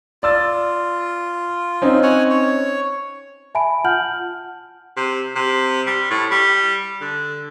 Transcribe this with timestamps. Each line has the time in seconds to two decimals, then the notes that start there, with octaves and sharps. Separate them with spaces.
0.23 F4 D5 E6 A6
1.82 C4 C#4 D#4
2.03 C#5 F#5 G#5
2.31 C#5
3.55 E5 G#5 A5 B5 D7
3.84 F4 F#5 A5 F6 G6 F#7
4.97 C3
5.35 C3
5.87 G3
6.10 A2
6.31 G3
7.01 D3